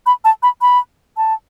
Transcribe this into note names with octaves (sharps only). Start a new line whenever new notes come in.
B5
A5
B5
B5
A5